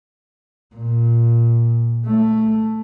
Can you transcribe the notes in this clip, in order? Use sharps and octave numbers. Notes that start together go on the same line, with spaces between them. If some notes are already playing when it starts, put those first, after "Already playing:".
A#2
A3